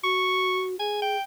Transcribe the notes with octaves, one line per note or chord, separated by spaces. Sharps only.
F#4 C#6
G#4 G#5
G5